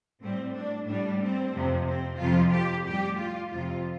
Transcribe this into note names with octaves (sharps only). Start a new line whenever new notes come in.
A2 G3 C4
D4
A2 G3 D4
C4
F2 C3 F3
C4
F2 C3 F3 F4
G4
A2 G3 G4
F4
F2 C3 F3 F4